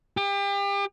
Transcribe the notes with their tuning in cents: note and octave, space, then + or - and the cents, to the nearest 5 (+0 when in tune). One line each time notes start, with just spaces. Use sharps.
G4 +35